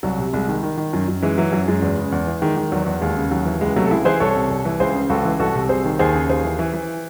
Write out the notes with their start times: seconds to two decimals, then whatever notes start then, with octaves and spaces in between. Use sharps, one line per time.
0.03 C2 F#3
0.19 C3
0.34 C2 G#3
0.49 D#3
0.63 D#3
0.78 D#3
0.93 F#2
1.08 F#2
1.23 E3 G#3
1.38 E3 F#3
1.52 F#2 F#3
1.68 F#2 G#3
1.82 E2
1.97 C#3
2.12 E2
2.27 E3
2.42 D#3 G#3
2.57 D#3
2.72 E2 F#3
2.86 E2
3.01 D#2 G#3
3.17 C#3
3.31 D#2 F#3
3.46 E3
3.61 C#2 G#3
3.76 C3 F#3 A3
3.86 A4
3.91 C#2 E4 G#4
4.05 E3 G#4 C5
4.20 C2 A4 C#5
4.36 C3
4.51 C2
4.65 E3
4.80 C#2 G#4 C5
4.95 C#3
5.10 C#2 F#4 A4
5.25 E3
5.40 C2 F#4 A4
5.55 C3
5.69 C2 G#4 C5
5.85 D#3
5.99 D#2 G#4 C5
6.15 C#3
6.29 D#2 G#4 C5
6.44 E3
6.59 E3
6.74 E3